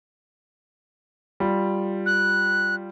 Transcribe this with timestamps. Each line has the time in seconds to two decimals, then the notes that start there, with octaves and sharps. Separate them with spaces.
1.40 G3 F4
2.06 F#6